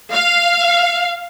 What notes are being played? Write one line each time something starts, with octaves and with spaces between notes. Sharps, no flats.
F5